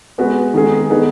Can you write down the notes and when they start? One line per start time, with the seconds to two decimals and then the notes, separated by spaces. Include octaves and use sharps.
0.18 G#3 B3 F#4 B4
0.54 D#3 G#3 B3 G#4
0.90 D#3 B3 D#4 G#4